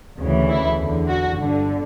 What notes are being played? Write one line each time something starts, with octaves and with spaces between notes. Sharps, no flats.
D2 C#3 E3
E4
E2 D3
F#4
G1 G2 D3